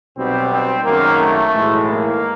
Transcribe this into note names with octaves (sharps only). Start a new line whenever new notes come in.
B1 B2 G3 C4
C4
G#1 F#2 D#3 A#3
A3
B1 A2 E3 G#3
A#3